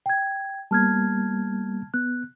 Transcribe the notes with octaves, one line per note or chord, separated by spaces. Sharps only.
G5 G#6
G3 A#3 B3 A5 F6 G#6
B3 F#6